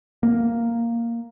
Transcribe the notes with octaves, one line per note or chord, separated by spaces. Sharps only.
A#3